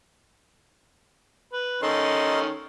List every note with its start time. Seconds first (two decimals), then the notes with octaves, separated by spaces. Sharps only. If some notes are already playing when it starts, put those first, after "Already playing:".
1.53 B4
1.82 D#3 C#4 D#4 A4 C6